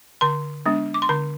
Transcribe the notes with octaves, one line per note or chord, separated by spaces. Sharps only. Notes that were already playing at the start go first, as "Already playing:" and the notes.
D3 C6
G#3 B3 D4
D6
C6
D3 B5